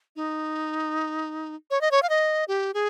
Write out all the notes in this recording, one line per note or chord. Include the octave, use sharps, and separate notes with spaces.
D#4
C#5
D#5
C#5
F5
D#5
G4
G#4